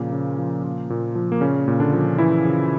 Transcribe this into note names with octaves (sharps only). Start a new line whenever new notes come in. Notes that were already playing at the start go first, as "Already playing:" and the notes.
Already playing: A#2 C#3 F3 A#3
C#3
F3
A#2
A#2
F3
A#3
A#2 C#3 C#4
A#2
D3 D4
F3
C#3 E3 E4
C#3